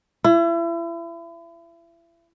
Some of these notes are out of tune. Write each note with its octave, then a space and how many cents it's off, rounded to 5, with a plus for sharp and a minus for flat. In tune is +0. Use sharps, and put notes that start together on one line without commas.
E4 +35